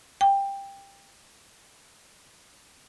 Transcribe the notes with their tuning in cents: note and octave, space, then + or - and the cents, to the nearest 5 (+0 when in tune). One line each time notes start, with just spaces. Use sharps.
G5 +15